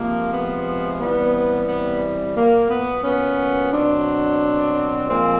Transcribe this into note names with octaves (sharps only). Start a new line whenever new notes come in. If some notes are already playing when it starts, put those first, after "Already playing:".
Already playing: C3 F3 G#3 A#3
B3
C3 E3 G3 B3
B3
A#2 F#3 A#3
B3
B3 C#4
B2 F#3 C4 D4
A#2 F3 G#3 A#3 C4